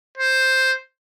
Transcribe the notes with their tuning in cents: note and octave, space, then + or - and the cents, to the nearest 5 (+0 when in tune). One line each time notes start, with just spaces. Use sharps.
C5 +5